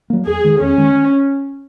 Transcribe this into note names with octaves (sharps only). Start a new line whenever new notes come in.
F#3 A#3
E2 G#4
D#3 G#3
E2 C#4
D#3 G#3